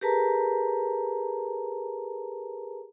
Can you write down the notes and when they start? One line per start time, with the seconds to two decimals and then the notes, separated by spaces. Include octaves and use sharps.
0.01 G4 G#4 A#4 B4 A5 A#5